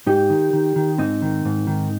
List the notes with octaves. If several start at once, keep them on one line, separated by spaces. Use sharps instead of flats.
G#2 D#4 G4
D#3
D#3
D#3
G#2 C4 D#4
D#3
G#2
D#3